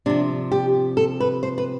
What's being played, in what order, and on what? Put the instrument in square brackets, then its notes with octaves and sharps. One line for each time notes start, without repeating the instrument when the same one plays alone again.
[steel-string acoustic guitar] C3 F3 D4
G4
A4
B4
C5
B4